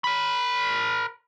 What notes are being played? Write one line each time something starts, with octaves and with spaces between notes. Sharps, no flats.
A#4 B5